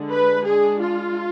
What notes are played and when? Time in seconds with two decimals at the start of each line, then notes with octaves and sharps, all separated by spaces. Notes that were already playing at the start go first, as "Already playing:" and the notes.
Already playing: D3 G#3 D4
0.11 B4
0.46 G#3 D4 G#4
0.82 F4